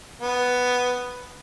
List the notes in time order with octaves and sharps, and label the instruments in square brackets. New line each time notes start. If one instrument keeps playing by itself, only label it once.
[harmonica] B3